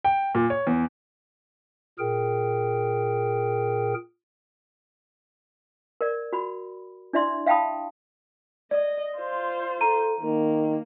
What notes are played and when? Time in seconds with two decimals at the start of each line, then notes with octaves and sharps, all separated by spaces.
0.05 G5
0.35 A#2
0.50 C#5
0.67 E2
1.99 A#2 G#4 A#4 G5
6.01 A#4 D5
6.32 F#4 B5
7.13 D4 E4 D5 E5 C6
7.46 E5 F5 G5 A5 B5 D#6
8.71 D5 D#5
9.17 F4 C5
9.81 A4 A#5 D#7
10.21 D#3 A#3